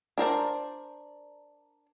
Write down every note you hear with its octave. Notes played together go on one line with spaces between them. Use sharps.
D4 A#4 C5 D5